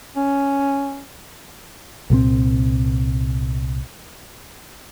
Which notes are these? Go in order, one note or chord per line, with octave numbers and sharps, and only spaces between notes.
C#4
C2 A#2 G3 C4